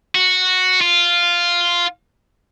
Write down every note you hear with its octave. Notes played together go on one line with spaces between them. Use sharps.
F#4
F4